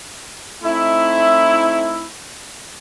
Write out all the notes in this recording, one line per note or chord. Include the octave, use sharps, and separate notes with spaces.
A3 C4 D#4 E4